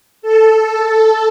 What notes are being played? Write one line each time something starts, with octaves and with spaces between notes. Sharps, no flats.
A4